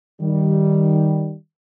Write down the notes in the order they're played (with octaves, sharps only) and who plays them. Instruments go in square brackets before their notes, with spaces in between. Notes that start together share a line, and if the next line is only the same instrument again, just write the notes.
[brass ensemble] D#3 G3